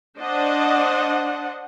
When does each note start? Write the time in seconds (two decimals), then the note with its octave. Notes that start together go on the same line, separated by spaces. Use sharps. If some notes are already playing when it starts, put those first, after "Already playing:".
0.18 D4 C5 D#5 F#5